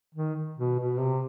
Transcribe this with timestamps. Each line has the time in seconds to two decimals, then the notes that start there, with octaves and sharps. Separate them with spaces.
0.14 D#3
0.58 B2
0.79 B2
1.00 C3